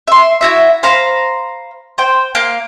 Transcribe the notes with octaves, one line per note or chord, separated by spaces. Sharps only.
E5 C6
E4 F#4 E5
C5 F5 A#5 B5
C5 G5
A#3 F5